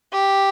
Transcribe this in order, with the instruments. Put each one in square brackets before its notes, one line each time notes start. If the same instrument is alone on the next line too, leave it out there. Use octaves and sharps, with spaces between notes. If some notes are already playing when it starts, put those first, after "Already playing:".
[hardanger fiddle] G4